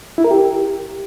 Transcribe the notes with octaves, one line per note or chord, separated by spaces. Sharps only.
E4
A#4
G4